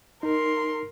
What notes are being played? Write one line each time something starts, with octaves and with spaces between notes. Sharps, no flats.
D#4 A#4 C6